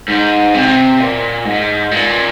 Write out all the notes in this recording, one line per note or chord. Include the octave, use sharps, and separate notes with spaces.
G#2
C3
A#2
G#2
A#2